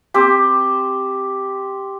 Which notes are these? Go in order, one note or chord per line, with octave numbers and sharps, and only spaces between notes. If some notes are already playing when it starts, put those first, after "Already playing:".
C4 G4